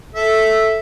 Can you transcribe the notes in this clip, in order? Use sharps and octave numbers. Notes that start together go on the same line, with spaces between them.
A4 E5